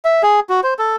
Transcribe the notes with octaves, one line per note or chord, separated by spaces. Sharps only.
E5
G#4
F#4
C5
A4